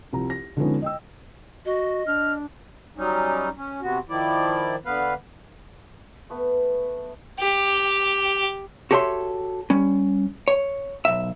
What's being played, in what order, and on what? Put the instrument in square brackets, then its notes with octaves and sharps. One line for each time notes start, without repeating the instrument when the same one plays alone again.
[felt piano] C2 F3 A#5
A#6
D3 F3 G#3 B3 C#4 D#4
D#5 G5 E6
[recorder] F#4 [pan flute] D#5
[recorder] D4 [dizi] F6
[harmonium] F#3 G3 C#4 D#4
C#4
C3 B3 F#4
D#3 F3 E4 D5
D3 B3 B4 F5
[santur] A3 B3
[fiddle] G4
[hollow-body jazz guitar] F#4 G4 A4 C#5 E5 C6
G3 C#4
C#5
B1 E5